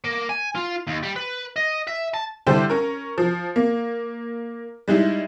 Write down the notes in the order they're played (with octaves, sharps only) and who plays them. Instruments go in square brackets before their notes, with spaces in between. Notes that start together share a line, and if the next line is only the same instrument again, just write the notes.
[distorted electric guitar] A#3
G#5
F4
D#2
G3
B4
D#5
E5
A5
[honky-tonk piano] D3 G3 E4 G4 A4 C5
C#4 A#4
F3
A#3
G3 G#3 D#4 E4